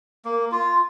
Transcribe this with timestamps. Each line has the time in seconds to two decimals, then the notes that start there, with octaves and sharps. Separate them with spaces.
0.25 A#3
0.52 F4